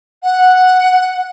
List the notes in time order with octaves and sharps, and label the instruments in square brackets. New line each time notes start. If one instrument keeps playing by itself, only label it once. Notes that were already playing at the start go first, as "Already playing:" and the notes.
[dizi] F#5